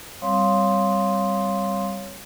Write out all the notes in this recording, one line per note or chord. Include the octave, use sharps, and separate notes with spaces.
G3 C4 C#5 F5 C6 D#6